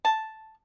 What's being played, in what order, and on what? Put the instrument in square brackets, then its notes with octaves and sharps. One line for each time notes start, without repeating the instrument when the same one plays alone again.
[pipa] A5